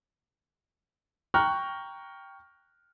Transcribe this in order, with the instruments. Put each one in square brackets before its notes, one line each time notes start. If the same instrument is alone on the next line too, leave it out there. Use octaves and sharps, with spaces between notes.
[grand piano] G5 A#5 C#6 F6 F#6